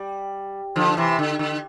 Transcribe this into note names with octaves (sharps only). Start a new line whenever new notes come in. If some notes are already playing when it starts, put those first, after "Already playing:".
Already playing: G3
D3 F3
C3 E3
D3
D3